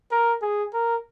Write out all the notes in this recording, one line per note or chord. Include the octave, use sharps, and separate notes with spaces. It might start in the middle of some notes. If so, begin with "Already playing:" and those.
A#4
G#4
A#4